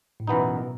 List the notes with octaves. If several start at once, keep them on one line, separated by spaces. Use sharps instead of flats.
A2
F#2 B2 E3 B3 D#4